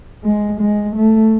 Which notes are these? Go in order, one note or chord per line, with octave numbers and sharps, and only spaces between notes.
G#3
G#3
A3